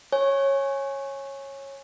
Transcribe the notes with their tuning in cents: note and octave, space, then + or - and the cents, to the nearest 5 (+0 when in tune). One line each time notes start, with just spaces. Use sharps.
C#5 -15 G#5 +0